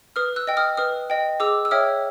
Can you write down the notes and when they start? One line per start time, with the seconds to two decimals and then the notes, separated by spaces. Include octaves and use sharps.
0.16 B4 D#6 F6
0.36 E6 F#6
0.47 D#5 G5
0.57 D#6 F6
0.77 B4 D#6 F6
1.10 D#5 G5
1.40 G#4 D6 E6
1.65 E6
1.71 C#5 E5 G5 D#6 F6